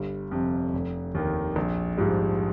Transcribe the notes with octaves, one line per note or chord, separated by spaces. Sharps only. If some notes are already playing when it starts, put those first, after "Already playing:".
Already playing: G1 G3
F2 C3
F1
D#2 D#3
A#1
G#2 F3 G3